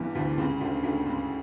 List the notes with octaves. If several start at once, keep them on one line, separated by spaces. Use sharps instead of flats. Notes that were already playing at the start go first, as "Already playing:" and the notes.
Already playing: E2 G2 E3 G3
D2 D3
C#2 C#3
D2 D3
D2 D3
C#2 C#3